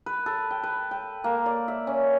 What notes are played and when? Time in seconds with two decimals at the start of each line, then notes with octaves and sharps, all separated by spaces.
0.06 B4
0.26 A4
0.51 G5
0.63 B4
0.91 G5
1.24 A#3
1.46 D5
1.68 E5
1.87 C#4